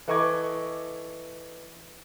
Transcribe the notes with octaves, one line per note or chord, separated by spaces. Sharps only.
E3 A4 D#5 C#6 D6 G#6